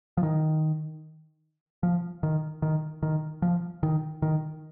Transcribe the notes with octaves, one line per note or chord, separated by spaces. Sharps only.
F3
D#3
F3
D#3
D#3
D#3
F3
D#3
D#3